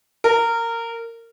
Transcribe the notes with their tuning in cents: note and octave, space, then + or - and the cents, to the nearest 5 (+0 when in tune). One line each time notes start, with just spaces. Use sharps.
A#4 -20